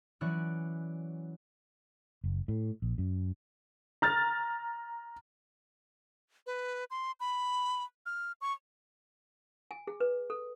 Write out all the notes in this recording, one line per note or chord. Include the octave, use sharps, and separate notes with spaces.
E3 F#3 C#4 D5 C#6 F#6
F#1
A2
A#1
F#2
A#5 F6 A6
B4
C6
B5
F6
C#6
G#5
G#4
B4
A4